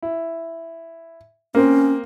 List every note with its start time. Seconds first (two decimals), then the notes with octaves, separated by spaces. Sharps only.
0.03 E4
1.55 A#3 C4 C#4